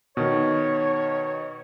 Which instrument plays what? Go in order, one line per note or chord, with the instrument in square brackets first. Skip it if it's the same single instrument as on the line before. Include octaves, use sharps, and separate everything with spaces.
[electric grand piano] B2 D#3 [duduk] C#5